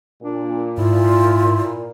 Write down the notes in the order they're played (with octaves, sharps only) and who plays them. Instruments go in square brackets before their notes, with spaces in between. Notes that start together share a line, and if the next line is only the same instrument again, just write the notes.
[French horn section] A#2 [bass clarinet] D4
[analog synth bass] G#2 [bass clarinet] E4 [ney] F4